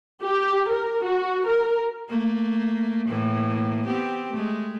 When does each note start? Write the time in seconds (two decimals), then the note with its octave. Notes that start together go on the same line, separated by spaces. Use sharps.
0.22 G4
0.69 A#4
1.04 F#4
1.46 A#4
2.09 A3 A#3
3.08 A2 E3 A#3
3.86 B3 C4 G4
4.33 G#3 A3